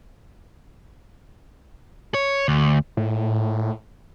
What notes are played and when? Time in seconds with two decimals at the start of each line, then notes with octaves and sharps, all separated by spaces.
2.14 C#5
2.48 D2
2.97 A2